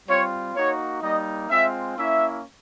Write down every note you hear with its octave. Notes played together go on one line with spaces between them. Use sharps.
G3 C4 F4 C#5
A#3 D#4 F#4 C#5
G3 A#3 D#4 D#5
G#3 C4 F4 E5
A#3 C#4 E4 E5